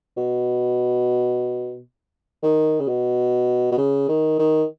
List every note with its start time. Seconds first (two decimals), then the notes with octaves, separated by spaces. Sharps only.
0.17 B2
2.43 D#3
2.80 C#3
2.88 B2
3.72 B2
3.78 C#3
4.09 D#3
4.39 D#3